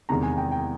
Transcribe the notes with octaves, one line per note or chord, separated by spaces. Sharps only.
E2 C3 D#3 G#3 A#5
G#5
G5
G5